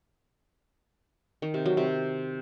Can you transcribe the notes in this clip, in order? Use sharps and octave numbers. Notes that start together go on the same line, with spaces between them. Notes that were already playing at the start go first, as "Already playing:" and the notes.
D#3
C3
F#3
C3